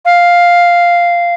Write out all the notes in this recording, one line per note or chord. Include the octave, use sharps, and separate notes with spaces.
F5